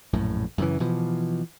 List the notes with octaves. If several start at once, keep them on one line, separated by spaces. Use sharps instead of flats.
A#1 F#2 A2
F#2 C#3 E3
B2 E3 F3